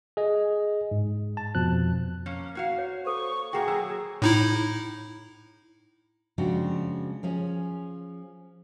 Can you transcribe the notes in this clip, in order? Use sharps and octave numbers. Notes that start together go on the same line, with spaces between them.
G#4 D#5
G#2
A5
F2 B2 F3 F#6
A#3 C#4
A#3 F#4 F5
C#5
A4 C5 C#6
A#2 A#3 F#4 G#4 G5 A#5 C#6
F#3 F#4 A#5 E6
A2 D#4 E4
C#3 F3 G#3 C4 D4 F#4
F3 C#4 G#4